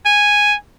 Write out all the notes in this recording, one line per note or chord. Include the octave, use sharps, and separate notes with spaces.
G#5